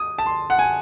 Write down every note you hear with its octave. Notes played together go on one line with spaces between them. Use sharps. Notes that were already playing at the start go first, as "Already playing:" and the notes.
Already playing: D#6
A5
C6
F#5
G#5